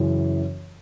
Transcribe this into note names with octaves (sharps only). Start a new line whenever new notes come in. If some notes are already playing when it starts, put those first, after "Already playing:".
Already playing: F#2 C#3 E3